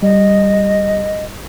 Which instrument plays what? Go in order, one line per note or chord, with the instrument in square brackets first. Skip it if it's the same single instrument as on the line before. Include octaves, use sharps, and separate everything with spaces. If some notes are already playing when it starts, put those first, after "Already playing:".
[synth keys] G3 [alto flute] D#5